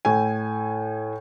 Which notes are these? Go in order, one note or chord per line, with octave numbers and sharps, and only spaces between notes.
A2 G#5